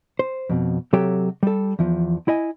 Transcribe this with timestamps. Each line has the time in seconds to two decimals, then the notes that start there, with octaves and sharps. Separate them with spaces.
0.19 C5
0.50 F2 B2
0.93 C3 F#3 G4 A4 C#5 G5
1.43 G3 A4
1.79 E2 F3
2.28 E4 D#5 G#5